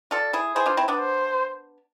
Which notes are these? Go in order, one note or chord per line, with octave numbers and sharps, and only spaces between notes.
F4 A4 D5
E4 G#4
E4 G#4 C5
D4 F4
C4 E4
B3 D4
C5